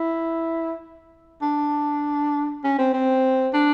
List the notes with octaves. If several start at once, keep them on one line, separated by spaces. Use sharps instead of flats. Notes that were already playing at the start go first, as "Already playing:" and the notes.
Already playing: E4
D4
C#4
C4
C4
D4